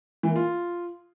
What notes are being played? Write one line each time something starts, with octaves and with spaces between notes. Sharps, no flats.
E3
A#3
F4